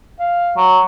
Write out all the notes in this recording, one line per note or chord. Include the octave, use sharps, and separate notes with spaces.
F5
F#3